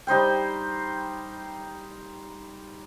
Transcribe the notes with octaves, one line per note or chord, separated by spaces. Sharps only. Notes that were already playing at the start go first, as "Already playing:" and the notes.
G3 D#4 C5 G5